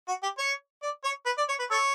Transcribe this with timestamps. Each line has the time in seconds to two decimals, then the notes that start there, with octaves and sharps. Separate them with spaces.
0.08 F#4
0.23 G4
0.38 C#5
0.82 D5
1.04 C#5
1.26 B4
1.38 D5
1.49 C#5
1.59 B4
1.71 A4 C#5